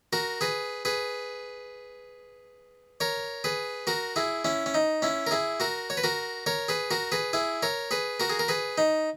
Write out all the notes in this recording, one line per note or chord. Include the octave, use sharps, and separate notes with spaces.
F#4 A#4
G#4 B4
G#4 B4
A#4 C#5
G#4 B4
F#4 A#4
E4 G#4
C#4 E4
C#4
D#4
C#4 E4
A#4
E4 G#4
F#4 A#4
C#5
B4
F#4 A#4
A#4 C#5
G#4 B4
F#4 A#4
G#4 B4
E4 G#4
A#4 C#5
G#4 B4
F#4 A#4
G#4
A#4
G#4 B4
D#4